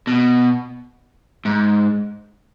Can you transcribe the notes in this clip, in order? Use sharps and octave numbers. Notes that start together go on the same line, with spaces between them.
B2
G#2